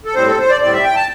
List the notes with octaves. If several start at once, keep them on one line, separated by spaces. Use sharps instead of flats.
A4
A2 G3 C4 C5
A4
C5
D5
A2 G3 C4 D5
E5
G5
A5